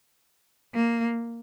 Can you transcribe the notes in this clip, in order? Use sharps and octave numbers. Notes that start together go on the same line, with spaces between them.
A#3